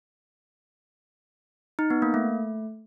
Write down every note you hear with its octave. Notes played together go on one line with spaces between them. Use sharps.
D#4
B3
A#3
A3